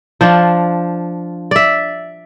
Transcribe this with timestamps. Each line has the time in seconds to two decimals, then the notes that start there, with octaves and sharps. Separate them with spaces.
0.21 F3 D4 F4
1.51 D5 E5